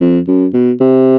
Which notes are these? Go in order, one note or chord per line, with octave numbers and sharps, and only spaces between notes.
F2
F#2
B2
C3